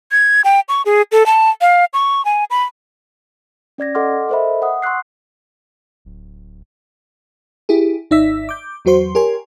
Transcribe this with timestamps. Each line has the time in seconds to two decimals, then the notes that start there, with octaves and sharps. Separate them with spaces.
0.12 G#6
0.44 G5
0.69 C#6
0.86 G#4
1.12 A4
1.26 A5
1.61 F5
1.94 C#6
2.25 G#5
2.50 B5
3.78 C#4 D5 G#6 A#6
3.95 A4 D#5 F#5 C6 D6 F6
4.29 A4 A#4 C5 D#5 E5 B5
4.62 F#5 D#6
4.82 C6 C#6 E6 F#6 C7
6.05 D1
7.69 E4 G4 G#4
8.11 G#1 D#4 D5 E5 E6 B6
8.49 D6 G6
8.85 E2 F#3 F#4 C5 C6
9.15 G4 A#4 C#5 G#5 C6